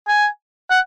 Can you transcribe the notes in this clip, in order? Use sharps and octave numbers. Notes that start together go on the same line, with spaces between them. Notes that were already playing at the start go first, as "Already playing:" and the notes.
G#5
F#5